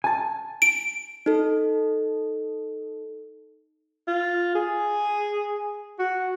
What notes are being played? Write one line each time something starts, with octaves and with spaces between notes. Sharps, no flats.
G#5 A5
D7
D#4 A4
F4
G#4
F#4